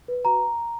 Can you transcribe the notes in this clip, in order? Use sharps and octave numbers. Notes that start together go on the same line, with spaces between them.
B4
F#4 A#5